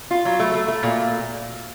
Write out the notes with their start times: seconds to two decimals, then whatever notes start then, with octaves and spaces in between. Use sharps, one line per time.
0.11 F4
0.25 F#3
0.40 A3
0.54 A3
0.68 A3
0.83 A#2